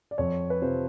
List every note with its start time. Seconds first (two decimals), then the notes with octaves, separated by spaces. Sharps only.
0.11 D5
0.18 F2 C#5
0.50 B4
0.62 C3 F3 C5